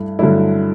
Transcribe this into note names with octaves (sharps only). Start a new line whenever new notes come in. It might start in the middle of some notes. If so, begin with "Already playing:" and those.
Already playing: G2 A3 E4
G2 D3 F#3 A3 E4